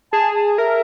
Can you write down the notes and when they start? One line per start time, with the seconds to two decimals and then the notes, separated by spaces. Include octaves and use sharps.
0.13 G#4 A5
0.35 A5
0.58 A#4 E5